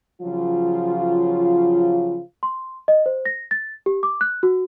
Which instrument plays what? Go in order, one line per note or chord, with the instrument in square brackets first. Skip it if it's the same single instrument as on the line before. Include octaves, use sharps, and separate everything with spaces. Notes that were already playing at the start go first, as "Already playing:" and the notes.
[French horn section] C#3 F3 F#3 F4
[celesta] C6
D#5
C5
A#6
A6
G4
D6
F#6
F#4